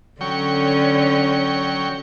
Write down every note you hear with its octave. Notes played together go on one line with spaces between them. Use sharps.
D3 F#3 C#4 G5 C#6